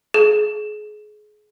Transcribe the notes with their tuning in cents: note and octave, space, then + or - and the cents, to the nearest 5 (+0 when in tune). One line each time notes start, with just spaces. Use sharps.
G#4 +30